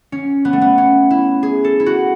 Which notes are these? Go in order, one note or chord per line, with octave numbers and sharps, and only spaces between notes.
C#4
B3
A3
B3
C#4
E4
G#4
A4
E4
F#4